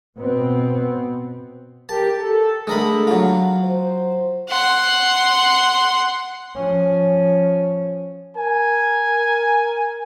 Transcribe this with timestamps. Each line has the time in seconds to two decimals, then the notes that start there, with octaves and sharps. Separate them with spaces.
0.17 B2 B3 C4
1.89 G4 A#4 A5
2.19 A4
2.67 D3 G#3 A3 A#4 B5
3.07 F#3 F4
3.63 C5
4.49 F#5 C6
6.56 F3 C#4
8.37 A#4 G#5